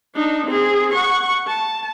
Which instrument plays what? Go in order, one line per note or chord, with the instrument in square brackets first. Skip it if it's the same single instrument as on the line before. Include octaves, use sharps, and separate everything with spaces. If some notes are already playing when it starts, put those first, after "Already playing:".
[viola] D4 D#4
C4 G#4
F#5 C#6
A5